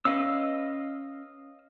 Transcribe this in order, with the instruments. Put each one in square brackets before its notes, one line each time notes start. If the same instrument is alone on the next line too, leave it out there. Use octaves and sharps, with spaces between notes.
[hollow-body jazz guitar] C#4 B4 [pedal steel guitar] D#5 F5 E6